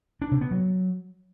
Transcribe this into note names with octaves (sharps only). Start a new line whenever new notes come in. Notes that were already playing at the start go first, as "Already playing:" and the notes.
D4
C3
B3
F#3